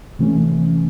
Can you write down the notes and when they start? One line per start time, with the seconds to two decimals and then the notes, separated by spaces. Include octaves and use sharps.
0.19 C3 E3 A3 C#4